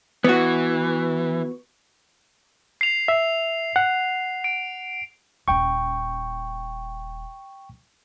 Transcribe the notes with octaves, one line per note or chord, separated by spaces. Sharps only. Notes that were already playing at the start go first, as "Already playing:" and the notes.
E3 B3 F#4
C7 F7
E5
F#5
D7
D#1 C#4 G5 C#6